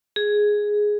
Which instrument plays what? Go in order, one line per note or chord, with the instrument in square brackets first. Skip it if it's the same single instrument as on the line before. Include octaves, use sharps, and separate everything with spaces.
[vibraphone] G#4